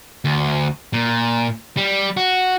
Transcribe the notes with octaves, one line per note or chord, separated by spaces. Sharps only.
D2
A#2
G3
F#4